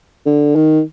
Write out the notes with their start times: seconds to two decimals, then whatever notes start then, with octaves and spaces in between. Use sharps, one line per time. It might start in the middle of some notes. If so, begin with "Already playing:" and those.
0.26 D3
0.55 D#3